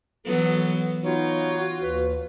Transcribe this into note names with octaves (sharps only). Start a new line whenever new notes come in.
E3 F#3 B3 A4
B3 D#4 F4 F#4 C#5
D#2 B4